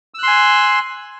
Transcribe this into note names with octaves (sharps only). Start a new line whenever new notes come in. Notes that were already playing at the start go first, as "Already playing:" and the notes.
G#5 C6 E6 F#6